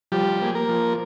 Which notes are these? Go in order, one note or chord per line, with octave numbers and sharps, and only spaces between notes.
F3 G3 G4
A#3 G#4
A#3 A#4
F3